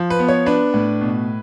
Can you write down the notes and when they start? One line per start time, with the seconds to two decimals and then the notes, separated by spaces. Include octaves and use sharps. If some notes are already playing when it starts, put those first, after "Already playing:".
Already playing: F3
0.10 B4
0.19 B3
0.28 C#5
0.46 D4 B4
0.74 A2
1.01 B2